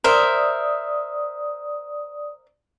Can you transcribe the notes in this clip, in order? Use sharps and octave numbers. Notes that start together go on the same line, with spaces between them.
A#4 C5 D5 E5 D#6